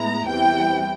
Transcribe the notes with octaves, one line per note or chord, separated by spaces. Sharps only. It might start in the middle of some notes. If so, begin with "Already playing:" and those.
Already playing: A2 G#3 B3 E4 A#5
E2 C3 E3 G3 G5